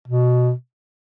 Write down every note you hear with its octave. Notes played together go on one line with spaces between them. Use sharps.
B2